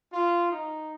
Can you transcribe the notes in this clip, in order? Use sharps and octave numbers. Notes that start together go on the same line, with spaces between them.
F4
D#4